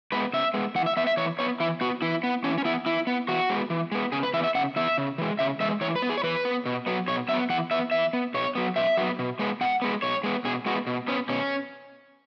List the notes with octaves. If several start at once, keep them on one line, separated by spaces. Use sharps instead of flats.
G#3 B3 B4
C#3 E5
G#3 B3
E3 F#5
E5
B3 E5
E5
E3 C#5
B3 C#5
E3 E4
B3 F#4
E3 E4
B3
E3 C#4
C#4
B3 E4
E3 E4
B3
E3 F#4
G#3 B3
E3
G#3 B3
C#3 G#4
B4
E3 B3 E5
E5
C#3 F#5
E3 B3 E5
C#3
E3 G#3
C#3 E5
E3 G#3 E5
E3 C#5
B4
B3
G#4
C#5
E3 B4
B3
B2
F#3 B3
B2 C#5
F#3 B3 E5
E3 F#5
B3 E5
E3 E5
B3
B2 C#5
F#3 B3
B2 E5
F#3 B3
B2
G#3 B3
B2 F#5
G#3 B3
B2 C#5
G#3 B3
B2 G#4
G#3 B3 F#4
B2
B3 C#4
B2 C#4